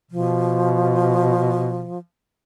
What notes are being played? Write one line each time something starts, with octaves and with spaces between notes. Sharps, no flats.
B2 F3